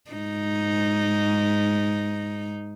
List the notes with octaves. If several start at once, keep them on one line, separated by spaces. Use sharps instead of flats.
G#2 D#4